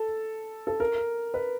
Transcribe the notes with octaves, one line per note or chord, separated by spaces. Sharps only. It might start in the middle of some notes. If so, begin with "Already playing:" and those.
Already playing: A4
A4
A#4
B4